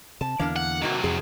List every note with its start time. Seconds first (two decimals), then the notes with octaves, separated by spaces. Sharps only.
0.21 C3 A5
0.39 E2 D3 E3 A#3 D4 A#4
0.56 F#5
0.82 C3 D#3 F#3 A#3 F#4
1.04 F2 A2 G#4